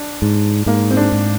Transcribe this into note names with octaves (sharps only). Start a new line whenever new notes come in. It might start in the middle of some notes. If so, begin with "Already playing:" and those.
Already playing: D4
G#2
G#2 A#3
C4
D4
G#2